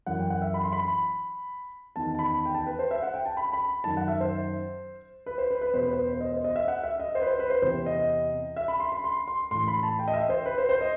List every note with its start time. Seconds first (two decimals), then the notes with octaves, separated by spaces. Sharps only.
0.06 F#2 E3 F#5
0.19 G5
0.30 F#5
0.42 E5
0.54 B5
0.64 C6
0.73 B5
1.96 E2 D#3 A5
2.15 A5
2.19 B5
2.45 G5
2.55 A5
2.67 B4
2.79 C5
2.91 E5
3.03 F#5
3.14 G5
3.26 A5
3.37 B5
3.53 B5
3.84 F#2 D#3 A5
3.97 F#5
4.08 E5
4.20 C5
5.26 B4
5.38 C5
5.50 B4
5.61 B4
5.73 E2 B2 C5
5.83 B4
5.93 C5
6.13 C5
6.20 D#5
6.32 C5
6.44 D#5
6.56 E5
6.68 F#5
6.83 E5
7.00 D#5
7.15 C5
7.22 B4
7.27 C5
7.39 B4
7.50 C5
7.62 E2 C3 E3 C5
7.86 D#5
8.56 E5
8.68 B5
8.80 C6
8.92 B5
9.04 C6
9.28 C6
9.51 A2 E3 C6
9.68 B5
9.83 A5
9.99 G5
10.08 D#5
10.14 E5
10.29 C5
10.46 B4
10.58 C5
10.69 C5
10.81 D#5